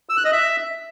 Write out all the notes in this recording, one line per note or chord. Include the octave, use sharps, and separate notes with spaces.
E6
F#6
D#5
E5